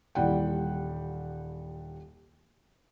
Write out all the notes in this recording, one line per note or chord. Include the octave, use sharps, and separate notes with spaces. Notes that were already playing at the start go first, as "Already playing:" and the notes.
D#1 E3 G3 F#5 G5